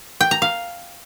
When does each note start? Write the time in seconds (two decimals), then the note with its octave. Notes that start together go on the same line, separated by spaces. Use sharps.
0.21 G5
0.31 A#5
0.42 F5